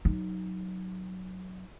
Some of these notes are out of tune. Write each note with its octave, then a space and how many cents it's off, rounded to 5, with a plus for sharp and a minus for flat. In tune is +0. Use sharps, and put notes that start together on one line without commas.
F#3 +0 D#4 +0